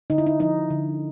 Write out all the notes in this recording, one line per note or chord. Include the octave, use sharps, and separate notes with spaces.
D3 D#4
E4
D#4
F3 D#4
D3